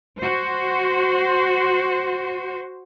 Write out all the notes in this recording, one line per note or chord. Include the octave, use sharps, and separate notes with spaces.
F#4 C5